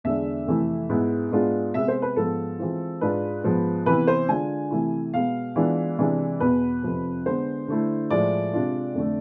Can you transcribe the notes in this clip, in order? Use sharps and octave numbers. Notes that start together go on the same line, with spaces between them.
E2 D3 G#3 D4 E5
F2 C3 E3 A3 E4
G#2 G#3 B3 E4
G#2 G#3 B3 D4 F4
C3 G#3 B3 E5
C5
B4
G#2 F3 B3 F4 A4
E3 G#3 C4 F4
G#2 G#3 D4 F4 B4
G#2 F3 B3
C3 E3 B3 E4 B4
C5
D3 G#3 D4 F4 G#5
C3 E3 A3 E4
B2 G#3 B3 F5
E3 G#3 B3 D4 F4
C3 E3 G#3 D4
E2 B2 B3 B4
F2 C3 F3
D3 G#3 B3 C5
D3 A3 E4
A2 F3 G#3 D5
C3 G#3 D4 F4
F2 D3 A3